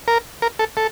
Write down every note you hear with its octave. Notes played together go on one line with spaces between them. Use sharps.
A#4
A#4
A4
A4